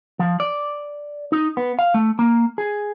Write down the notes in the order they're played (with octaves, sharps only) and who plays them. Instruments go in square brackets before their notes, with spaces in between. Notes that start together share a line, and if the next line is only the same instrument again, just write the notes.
[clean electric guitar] F3
D5
D#4
B3
F5
A3
A#3
G#4